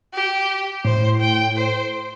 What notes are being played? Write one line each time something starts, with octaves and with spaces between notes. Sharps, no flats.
G4
A2 C5
G5
C5